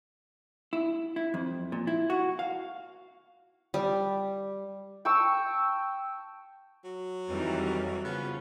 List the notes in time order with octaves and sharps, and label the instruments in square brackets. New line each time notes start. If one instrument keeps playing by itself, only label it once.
[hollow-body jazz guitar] E4
E4
F2
A#2
E4
F#4
F5
[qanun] G3
[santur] G5 A5 C#6 E6
[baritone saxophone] F#3
[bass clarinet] F2 [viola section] D#3 E3 G3
[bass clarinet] C#3 [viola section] F3 C#4 [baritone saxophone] B3